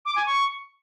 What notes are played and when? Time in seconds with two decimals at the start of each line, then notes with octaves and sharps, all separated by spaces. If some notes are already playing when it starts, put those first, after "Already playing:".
0.06 D6
0.16 G#5
0.26 C#6